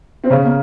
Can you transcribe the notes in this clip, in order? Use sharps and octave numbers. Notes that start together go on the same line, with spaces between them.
C4
C#3 C#4
A#3